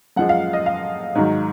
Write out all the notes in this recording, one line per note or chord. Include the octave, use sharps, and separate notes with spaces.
F#2 F3 G#3 F#5
F5
D#5
F5
G#2 D#3 F#3